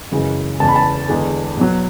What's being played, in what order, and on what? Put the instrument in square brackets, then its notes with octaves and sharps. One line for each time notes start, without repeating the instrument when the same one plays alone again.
[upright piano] F#2 C#3 E3 G#3
E2 C#3 E3 G#3 A5
B5
A5
E2 D3 G#3
B2 F#3